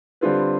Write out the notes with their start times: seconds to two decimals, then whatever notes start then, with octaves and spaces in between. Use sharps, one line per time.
0.21 D3 G3 C4 F4 B4